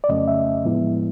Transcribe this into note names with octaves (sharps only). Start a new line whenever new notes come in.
D5
F2 C#3 F#3 A3 C#4 D#5
E5
A2 F3 G#3 B3 E4